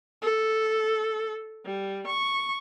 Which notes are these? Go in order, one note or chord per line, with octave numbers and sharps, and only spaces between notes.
A4
G3
C#6